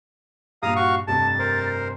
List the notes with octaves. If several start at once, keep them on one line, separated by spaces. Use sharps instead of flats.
G2 A#2 F5 A#5 D#6
F#4 F5 C#6
F1 G2 A5 A6
A#4 C5